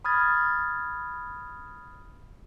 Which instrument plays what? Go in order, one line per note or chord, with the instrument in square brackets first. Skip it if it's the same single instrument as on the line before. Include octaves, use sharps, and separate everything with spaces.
[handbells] B5 D#6 F6 G#6 A6